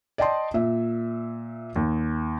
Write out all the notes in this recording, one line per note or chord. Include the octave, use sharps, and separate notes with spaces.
D5 D#5 G5 A5 C6
A#2 E5
D#2